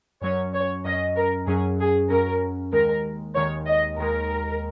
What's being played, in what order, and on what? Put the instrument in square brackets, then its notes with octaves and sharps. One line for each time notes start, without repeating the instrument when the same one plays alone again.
[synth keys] F#2 F#3 C#4 [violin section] C#5
[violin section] C#5
[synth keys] F#2 F#3 C#4 [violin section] D#5
[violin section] A#4
[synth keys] F#2 F#3 C#4 [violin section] G#4
[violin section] G#4
[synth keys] F#2 F#3 C#4 [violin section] A#4
[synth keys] D#2 D#3 G#3 [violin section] A#4
[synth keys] D#2 D#3 G#3 [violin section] C#5
[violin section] D#5
[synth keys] D#2 D#3 G#3 [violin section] A#4